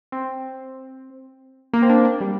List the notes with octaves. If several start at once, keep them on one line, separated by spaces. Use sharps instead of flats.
C4
A#3
C4
D4
D4
G3